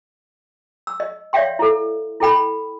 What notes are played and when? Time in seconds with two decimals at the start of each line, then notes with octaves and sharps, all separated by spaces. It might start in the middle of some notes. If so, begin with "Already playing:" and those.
0.87 E6
1.00 D#5
1.33 C#5 D5 E5 F5 G5 C6
1.59 E4 A4
2.20 E4 A4 G5 B5